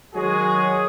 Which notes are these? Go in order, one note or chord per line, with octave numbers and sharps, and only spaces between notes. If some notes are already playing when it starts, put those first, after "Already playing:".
D#3 F#3 G#3 F#4 G#4